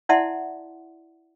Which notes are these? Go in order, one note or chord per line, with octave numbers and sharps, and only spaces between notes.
E4 D5 E5 F#5 A5 C6